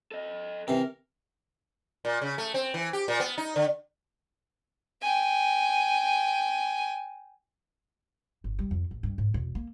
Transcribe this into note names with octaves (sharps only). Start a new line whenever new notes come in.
A4 D#5
C3 E3 A#4
A#2
C#3
A3
C4
E3
G4
A#2
B3
D#4
D3
G5 G#5
G1
G3
F2
A1
G2
G#2
E1
A#3